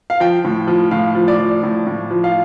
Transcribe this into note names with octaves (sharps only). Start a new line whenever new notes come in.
F5
F3 G5
A2
F3
A2 F5
F3
D5
F3
A2
A2
F3
F5